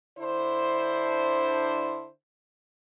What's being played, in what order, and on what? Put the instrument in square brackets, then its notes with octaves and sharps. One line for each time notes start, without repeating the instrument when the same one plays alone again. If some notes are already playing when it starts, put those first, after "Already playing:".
[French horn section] D3 D4 E4 C5